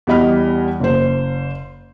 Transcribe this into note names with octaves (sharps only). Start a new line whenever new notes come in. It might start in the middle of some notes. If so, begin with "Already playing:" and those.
E2 G3 D#5 B5 F6
F#1 C5